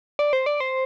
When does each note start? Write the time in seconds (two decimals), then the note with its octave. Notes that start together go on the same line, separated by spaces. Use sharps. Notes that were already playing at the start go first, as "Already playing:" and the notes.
0.19 D5
0.33 C5
0.46 D5
0.60 C5